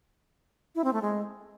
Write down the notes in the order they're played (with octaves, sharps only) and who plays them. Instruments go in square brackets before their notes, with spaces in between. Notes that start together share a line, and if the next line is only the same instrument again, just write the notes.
[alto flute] E4
C4
A3
G#3